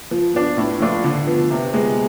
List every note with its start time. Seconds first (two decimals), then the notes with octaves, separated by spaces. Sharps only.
0.11 F3
0.34 B3 D4
0.57 A2
0.80 F3 A3 D4 F4
1.04 D3
1.27 F3 B3
1.50 C3
1.74 G#3 B3